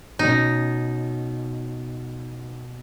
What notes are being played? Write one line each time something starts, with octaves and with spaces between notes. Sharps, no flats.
B2 C#4 D#4